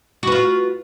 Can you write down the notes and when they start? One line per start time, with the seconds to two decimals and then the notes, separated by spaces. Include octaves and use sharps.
0.23 F#4
0.27 B4
0.32 F4